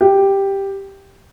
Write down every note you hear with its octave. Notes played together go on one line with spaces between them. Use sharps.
G4